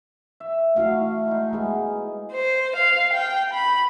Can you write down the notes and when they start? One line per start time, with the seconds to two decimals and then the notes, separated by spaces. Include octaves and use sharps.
0.40 E5
0.76 A3 E4 F#4 F5
1.28 G#3 D#4
1.53 G#3 B3 G#4 G#5
2.33 C5
2.76 F5
3.14 G5
3.54 B5